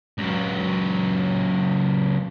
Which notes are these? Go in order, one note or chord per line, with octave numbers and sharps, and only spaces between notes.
C#2 F#3